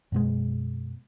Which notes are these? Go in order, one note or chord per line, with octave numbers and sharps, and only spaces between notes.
F#2 B2 G#3